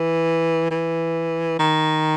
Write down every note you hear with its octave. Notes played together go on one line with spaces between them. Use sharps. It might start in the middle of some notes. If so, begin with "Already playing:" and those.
Already playing: E3
E3
D#3